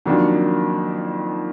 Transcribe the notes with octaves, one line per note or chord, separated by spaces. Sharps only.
F2 D#3 F#3 A#3 D4